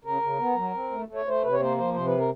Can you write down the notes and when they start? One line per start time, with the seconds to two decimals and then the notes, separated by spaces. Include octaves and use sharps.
0.05 C#3 A#4
0.22 C#3
0.39 B3
0.56 F#3
0.74 C4
0.91 A3
1.08 A3
1.15 C#5
1.26 A3 C5
1.43 C3 B4
1.52 C#5
1.60 A#3 C5
1.78 F3 C5
1.94 C3 C5
2.06 B4
2.18 A#4